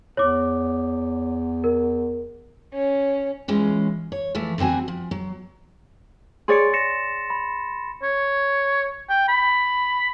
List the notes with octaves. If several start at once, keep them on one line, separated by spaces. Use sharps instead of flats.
E2 C#5 D6
A#4
C#4
E3 G#3 C#4 F4
C#5
E3 F3 A3
D3 G3 C4 F#4 G#5
F3
F#3
G#4 C#5 D5 C6 A6 C#7
A#6 C#7 E7
B5
C#5
G5
B5